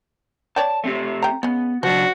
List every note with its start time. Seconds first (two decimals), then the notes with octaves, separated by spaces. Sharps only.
0.56 C#5 D5 G5 A5
0.84 A3 C4 G4
1.23 G5 A#5
1.43 C#3 G#3 B3
1.83 C#3 F3 F#3 D4 F#4